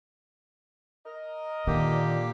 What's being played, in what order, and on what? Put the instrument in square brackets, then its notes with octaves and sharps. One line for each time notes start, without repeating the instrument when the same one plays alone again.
[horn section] A#4 D#5
[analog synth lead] A#2 [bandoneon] D3 A#3 G4 [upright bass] D#3